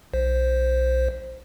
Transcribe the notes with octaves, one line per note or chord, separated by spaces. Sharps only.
B1 C5